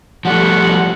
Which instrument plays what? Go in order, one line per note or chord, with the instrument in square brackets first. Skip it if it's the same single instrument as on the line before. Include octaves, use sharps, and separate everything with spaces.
[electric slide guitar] F3 G3 A3 [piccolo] F#5